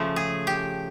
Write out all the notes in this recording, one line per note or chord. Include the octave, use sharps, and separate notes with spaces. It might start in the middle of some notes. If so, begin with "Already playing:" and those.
Already playing: C#3 F3 A3
G#4
G4